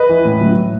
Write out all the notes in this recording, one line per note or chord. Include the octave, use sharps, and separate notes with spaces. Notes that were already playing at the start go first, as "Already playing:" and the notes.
Already playing: B4 D#5
E3
A2
F#3
A2